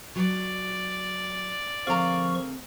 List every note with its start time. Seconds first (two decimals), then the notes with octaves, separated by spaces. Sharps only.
0.16 F#3 D5
1.87 D2 F3 C4 G#4 A#4 F5 C#6